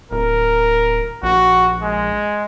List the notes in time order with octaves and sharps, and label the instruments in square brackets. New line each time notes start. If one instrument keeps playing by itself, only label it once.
[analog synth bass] D1 [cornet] A#4
[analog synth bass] A#1 [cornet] F#4
[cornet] G#3